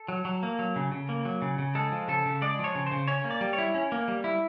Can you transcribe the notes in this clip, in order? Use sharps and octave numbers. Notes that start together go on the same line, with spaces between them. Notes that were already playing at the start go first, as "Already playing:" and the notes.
Already playing: A4
F#3
F#3
A#3
F#3
C#3
C#3
A#3
F#3
C#3
C#3
G#3 A4
F3
C#3 A4
C#3
G#3 D5
F3
C#5
C#3
C5
C#3
C#4 C#5
A#3
D5
G3
C#5
E4
C#4
A#3
G3
E4